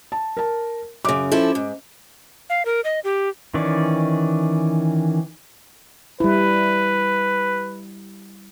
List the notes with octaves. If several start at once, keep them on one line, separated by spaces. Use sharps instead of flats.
A5
A#4 A5
F#2 C#3 D6
F3 C#4 E4 A4
G#2
F5
A#4
D#5
G4
D#3 E3 C#4 D5
G3 E4 B4